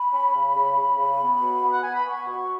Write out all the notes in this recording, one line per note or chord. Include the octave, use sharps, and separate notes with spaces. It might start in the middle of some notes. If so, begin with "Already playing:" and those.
Already playing: B5
C#4
C#3
C#3
C#3
C#3
B3
B2
B3
F#5
B3 G#5
B5
B3 C#6
B2